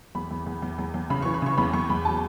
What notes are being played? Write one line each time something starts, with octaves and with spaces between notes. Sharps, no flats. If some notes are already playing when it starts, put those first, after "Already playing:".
E2 B5
E2
E2
E2
E2
E2
C#3 B5
E3 C#6
B5
C#3 C#6
E2 B5
E2 C#6
E2 B5
F#3 A5